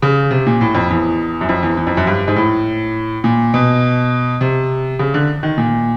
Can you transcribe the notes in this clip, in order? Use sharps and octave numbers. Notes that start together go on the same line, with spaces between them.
C#3
C3
A#2
A2
F2
E2
F#2
F2
E2
E2
F2
F#2
G2
G#2
A2
A#2
B2
C3
C#3
D3
D#3
A#2